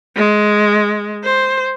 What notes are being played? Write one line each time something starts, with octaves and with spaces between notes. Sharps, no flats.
G#3
C5